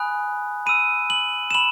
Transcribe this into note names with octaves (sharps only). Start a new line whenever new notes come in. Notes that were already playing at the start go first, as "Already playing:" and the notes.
Already playing: G#5 B5 D#6 F#6
B5 E6 D#7
F#7
E7
B5 F#7